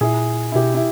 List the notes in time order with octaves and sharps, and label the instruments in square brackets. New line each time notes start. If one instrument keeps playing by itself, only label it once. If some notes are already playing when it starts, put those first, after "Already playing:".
[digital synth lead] A#2 [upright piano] E4 G#4
[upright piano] E4
[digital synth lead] B2 [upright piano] G4
[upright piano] E4